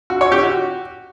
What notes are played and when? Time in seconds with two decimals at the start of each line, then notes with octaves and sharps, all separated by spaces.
0.10 F#4
0.21 C#5
0.32 G4
0.43 F#4